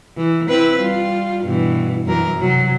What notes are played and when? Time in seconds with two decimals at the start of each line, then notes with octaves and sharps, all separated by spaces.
0.17 E3
0.49 C4 E4 B4
0.80 G3 F4
1.44 G2 B2 E3
2.06 F#2 E3 A#4
2.39 C3 F#3